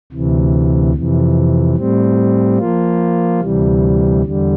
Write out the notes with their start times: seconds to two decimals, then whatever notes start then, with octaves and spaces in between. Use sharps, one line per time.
0.12 D2 C3 E3
0.93 F2 C3 E3
1.76 A2 G3 C4
2.58 F3 A#3 F4
3.40 D2 C3 E3 G3
4.23 E2 D3 G3